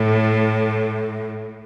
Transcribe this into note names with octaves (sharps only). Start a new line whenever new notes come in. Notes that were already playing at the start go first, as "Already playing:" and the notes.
Already playing: A2